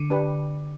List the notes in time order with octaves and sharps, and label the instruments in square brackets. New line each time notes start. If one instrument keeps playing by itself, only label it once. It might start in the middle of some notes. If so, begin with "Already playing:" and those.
Already playing: [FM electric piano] D3
[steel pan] D4 G4 B4